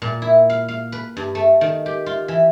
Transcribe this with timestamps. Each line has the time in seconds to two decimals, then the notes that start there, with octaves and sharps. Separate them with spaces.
0.02 A#2
0.22 E4
0.50 F5
0.68 F5
0.92 B4
1.17 G2
1.35 A3
1.61 D#3
1.86 G4
2.06 F4
2.28 E3